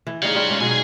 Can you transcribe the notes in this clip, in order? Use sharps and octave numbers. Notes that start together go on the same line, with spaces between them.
E3
G3 D#4 G#4 C#5 F5
G3 F4 F#5
G#2 G#3 C#4
B2 F#3 G#4 G#5